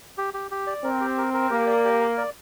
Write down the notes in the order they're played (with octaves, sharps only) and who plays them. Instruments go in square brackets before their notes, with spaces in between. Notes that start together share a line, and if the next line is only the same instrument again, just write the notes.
[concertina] G4
G4
G4
D5
[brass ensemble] C4 [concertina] A#4
[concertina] G4
A#4
A#4
[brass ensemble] A#3 [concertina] G4
[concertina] D5
G4
A#4
D5